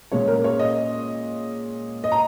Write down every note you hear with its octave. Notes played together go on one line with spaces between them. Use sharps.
A#2 G#3 C#4 C#5
A#4
C#5
D#5
D#5
A#5